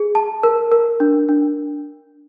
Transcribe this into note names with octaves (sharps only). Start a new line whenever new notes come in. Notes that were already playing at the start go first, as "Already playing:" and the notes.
Already playing: G#4
A5
A#4
A#4
D4
D4